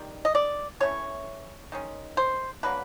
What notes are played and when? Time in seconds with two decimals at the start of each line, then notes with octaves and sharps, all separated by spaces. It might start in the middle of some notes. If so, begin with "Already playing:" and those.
Already playing: D#3 G3
0.25 D#5
0.35 D5
0.80 E3 A3 C#4 C#5
1.72 D#3 G#3 C#4
2.17 C5
2.63 D3 F#3 A#3 B4